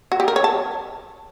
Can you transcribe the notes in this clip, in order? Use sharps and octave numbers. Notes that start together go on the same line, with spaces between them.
F#4
G4
A#4
C#5
A5